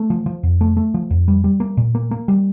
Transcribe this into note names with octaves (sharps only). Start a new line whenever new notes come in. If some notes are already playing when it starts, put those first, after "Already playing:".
Already playing: A3
F3
F3
F2
A3
A3
F3
F2
G3
G3
A#3
A#2
A#3
A#3
G3